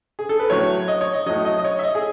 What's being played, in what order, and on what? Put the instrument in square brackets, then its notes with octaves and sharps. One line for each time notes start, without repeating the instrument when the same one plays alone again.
[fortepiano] G#4
A4
B4
A2 F#3 C#5
D#5
C#5
D#5
A2 F#3 D#5
D#5
D#5
C#5
E5
D#5
G#4